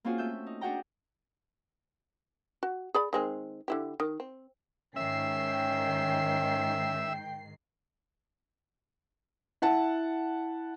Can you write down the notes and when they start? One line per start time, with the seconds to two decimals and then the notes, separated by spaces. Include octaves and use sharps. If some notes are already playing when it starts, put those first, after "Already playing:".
0.05 A#3 C4 C#4 F4 F#4 G#4
0.18 A3 E5 E6 G6
0.46 D#4
0.61 D4 F#4 G#4 F#5 G5 A#5
2.63 F#4
2.94 G#4 D5 B5
3.13 D#3 G#3 C4
3.68 D3 E4 G4
4.00 D#3
4.20 C4
4.96 G#2 D#3 C#4 E5 G5 C7
9.62 E4 F#5 A5